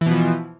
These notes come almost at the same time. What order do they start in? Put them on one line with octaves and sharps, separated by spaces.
E3 B2 F3